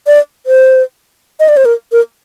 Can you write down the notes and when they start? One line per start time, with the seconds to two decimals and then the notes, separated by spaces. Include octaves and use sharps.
0.07 D5
0.46 C5
1.40 D#5
1.48 D5
1.57 C5
1.65 A#4
1.92 A#4